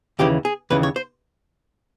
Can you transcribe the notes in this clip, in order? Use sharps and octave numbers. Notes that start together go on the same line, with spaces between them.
D#2 C#3 E3 G4
G#4
D#2 C#3 E3 B4
C#5
C5